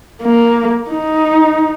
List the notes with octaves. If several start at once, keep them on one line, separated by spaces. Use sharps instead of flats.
A#3
D#4